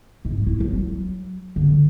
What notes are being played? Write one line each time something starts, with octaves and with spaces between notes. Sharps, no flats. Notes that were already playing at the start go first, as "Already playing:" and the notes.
G#2
E4
F#3
D3